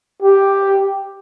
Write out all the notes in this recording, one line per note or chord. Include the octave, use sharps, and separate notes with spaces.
G4